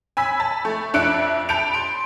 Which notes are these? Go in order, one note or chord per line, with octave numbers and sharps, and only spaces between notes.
G#5 B5 E6 B6
A5 B5
A3
F2 D4 E5 F#6 C#7 D7
A5 B5 G6 C#7 D7 F7
C6 D7